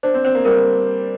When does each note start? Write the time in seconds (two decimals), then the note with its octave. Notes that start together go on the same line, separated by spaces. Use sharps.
0.03 D4 C5
0.14 C4
0.24 C4 C5
0.35 A#3
0.45 G3 A#4